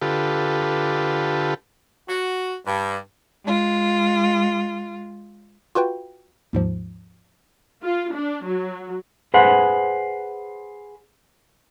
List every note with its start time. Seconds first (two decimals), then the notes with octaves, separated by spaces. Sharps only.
0.02 D3 F4 G4 A4 B4
2.09 F#4
2.66 G2
3.44 G#3 F4
5.75 F4 F#4 B4 G5
6.53 D#2 G#2 F3
7.82 F4
8.14 D4
8.45 F#3
9.34 G#4 B4 C5 F#5